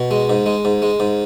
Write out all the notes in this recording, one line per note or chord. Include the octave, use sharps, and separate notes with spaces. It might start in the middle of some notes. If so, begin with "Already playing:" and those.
Already playing: B2
G#3
G#2
G#3
G#2
G#3
G#2